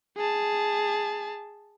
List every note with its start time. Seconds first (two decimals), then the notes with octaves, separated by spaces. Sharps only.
0.17 G#4 A5